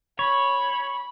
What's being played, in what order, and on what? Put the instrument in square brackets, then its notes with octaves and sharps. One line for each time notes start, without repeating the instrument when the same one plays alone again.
[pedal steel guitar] C#5 [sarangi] B5